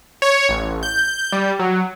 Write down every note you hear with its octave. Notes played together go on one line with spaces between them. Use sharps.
C#5
A1
G6
G3
F#3